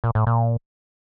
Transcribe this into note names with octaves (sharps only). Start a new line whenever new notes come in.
A#2
A2
A#2